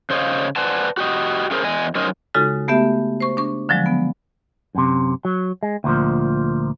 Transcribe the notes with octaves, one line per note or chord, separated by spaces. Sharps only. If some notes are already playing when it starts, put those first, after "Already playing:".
C#3 C5 C#5 D#5 F5
B4 C5 D5 F#5 G#5 A5
F#4 G4 D#5
A3 C#4 G#4 A#4 C5
E2 D#5 G#5
F#3 C#4 D#4 A#4 C5 D#5
C#3 G#3 D#4 F4 F#4 A4
A3 B3 G4 E5
C5 C#6
D4 C#6
D3 F3 F#3 G#3
B3
F#2 C3
F#3
G#3
D2 A#2 F3